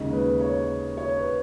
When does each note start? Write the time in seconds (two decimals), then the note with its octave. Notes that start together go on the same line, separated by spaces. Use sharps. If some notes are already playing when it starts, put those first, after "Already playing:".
Already playing: D#2 C#3 G#3 D#4 D#5
0.12 B4
0.40 C#5
0.97 C#5
1.16 B4